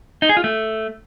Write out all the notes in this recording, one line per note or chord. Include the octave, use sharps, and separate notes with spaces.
D#4
G#4
F4
A3